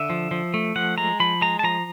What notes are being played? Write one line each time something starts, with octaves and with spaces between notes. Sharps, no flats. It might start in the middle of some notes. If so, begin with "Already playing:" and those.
Already playing: D3 E5
F3
F3
A3
F3 F#5
G#3 A#5
F3 B5
G#3 A#5
A5
F3 A#5